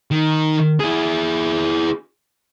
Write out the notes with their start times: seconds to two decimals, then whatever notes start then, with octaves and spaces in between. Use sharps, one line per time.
0.11 D#3
0.80 E4 G#4